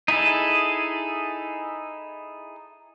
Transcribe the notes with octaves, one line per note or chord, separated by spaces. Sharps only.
D#4 E4 G#4 A4